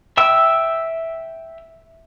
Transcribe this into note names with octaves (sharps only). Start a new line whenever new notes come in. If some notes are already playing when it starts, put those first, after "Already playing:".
E5 G5 E6